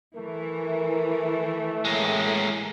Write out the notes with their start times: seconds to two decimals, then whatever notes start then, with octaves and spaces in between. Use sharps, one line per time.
0.16 E3 A3 A#4
1.85 A2 G#3 A#3